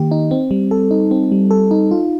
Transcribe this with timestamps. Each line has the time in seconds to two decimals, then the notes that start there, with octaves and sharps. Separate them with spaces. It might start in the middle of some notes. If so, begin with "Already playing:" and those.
Already playing: D#3 A#3 G4
0.11 D#4
0.31 C4
0.51 G3
0.71 A4
0.91 D#4
1.11 C4
1.31 G3
1.51 A4
1.71 D#4
1.91 F4